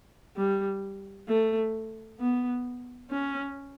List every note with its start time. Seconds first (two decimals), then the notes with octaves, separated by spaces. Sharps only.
0.36 G3
1.28 A3
2.20 B3
3.11 C#4